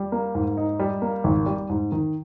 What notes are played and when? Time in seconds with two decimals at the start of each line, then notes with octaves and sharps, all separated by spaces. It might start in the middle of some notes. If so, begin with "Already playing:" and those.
Already playing: G3
0.12 A#3
0.35 G#2
0.57 D#4
0.79 G3
1.02 A#3
1.24 G#1
1.46 G3
1.70 G#2
1.92 D#3